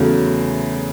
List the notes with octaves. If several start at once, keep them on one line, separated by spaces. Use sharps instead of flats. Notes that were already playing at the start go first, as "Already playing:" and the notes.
Already playing: E2 C#3 F#3 A3